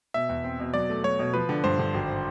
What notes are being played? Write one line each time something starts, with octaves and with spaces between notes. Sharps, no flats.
B2 E5
E2
C4
B2
F#3 D5
A3
F#3 C#5
B2
F3 B4
D3
G2 C5
D3
G#1